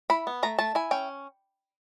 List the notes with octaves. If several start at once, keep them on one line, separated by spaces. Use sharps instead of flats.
E4 B5
B3
A3 A#5
A3 A5
E4 G#5
C#4 G5